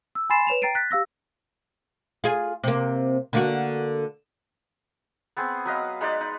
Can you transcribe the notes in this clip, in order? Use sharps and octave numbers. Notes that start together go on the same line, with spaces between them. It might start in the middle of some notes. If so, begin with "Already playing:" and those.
E6
G#5 B5 C6 A6 C7 E7
B4 C#5 E7 F7
G5 A#5 A6 C7 D7 D#7
F#6 A6 B6
G4 F5 E6 A#6
F4 G#4
C3 A#3
D3 A#3 F#4
B3 C4 G#4
F#3 B4 D#5 F5
G#3 D#4 B4 D5
D#4